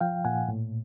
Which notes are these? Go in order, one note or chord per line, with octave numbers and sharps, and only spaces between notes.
F3 F5 G5
A#2 F#5 G#5
A2